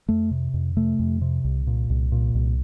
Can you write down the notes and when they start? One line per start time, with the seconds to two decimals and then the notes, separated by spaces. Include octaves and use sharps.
0.09 F2 A3
0.31 C3
0.54 F2
0.77 C3 A3
0.99 F2
1.22 C3
1.44 C2
1.67 A#2
1.90 C2
2.12 A#2
2.34 C2